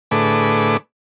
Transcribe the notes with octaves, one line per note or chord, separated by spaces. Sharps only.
A2 D3 A3 G#4 B4 D6